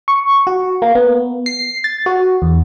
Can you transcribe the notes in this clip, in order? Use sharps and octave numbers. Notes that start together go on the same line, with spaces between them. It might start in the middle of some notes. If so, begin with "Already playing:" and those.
C#6
F#4
A#3
B3
C7
A6
F#4
E2